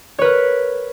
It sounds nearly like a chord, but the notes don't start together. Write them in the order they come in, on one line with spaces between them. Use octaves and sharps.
C#5 B4 A#4